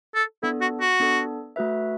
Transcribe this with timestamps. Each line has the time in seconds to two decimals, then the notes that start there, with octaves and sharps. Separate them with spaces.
0.15 A4
0.43 B3 D4 E4 A4
0.61 F#4
0.80 F#4
1.00 B3 D4 A4
1.56 A3 F#4 B4 E5